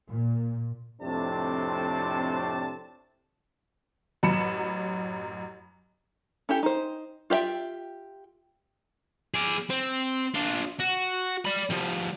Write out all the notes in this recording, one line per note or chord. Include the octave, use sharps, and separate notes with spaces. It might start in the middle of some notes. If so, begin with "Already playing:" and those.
A#2
F2 A2 C3 C4 D4 A5
A1 F#2 F#3 B5 C#7 E7
C#4 E4 G4 A4
D#4 C5
F4 G4 C5 E5 G5
G#4 D5
C4
D4 F4
F#4
D5 B5
F3 G3